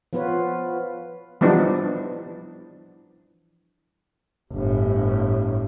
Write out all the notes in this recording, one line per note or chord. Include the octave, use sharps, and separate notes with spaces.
F3 B3 F4 B4 C#5
E3 F3 G3 B3 D4 D#4
G1 A2